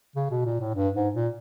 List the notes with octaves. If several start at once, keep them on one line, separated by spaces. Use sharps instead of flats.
C#3
B2
A#2
A2
G2
G#2
A#2